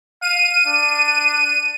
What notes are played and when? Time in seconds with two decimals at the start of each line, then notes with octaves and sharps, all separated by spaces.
0.22 F5 D#7
0.67 D4